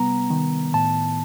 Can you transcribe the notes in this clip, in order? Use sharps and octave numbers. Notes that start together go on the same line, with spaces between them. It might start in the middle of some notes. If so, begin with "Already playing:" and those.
Already playing: C3 G3 B3 A#5
D#3
A2 A5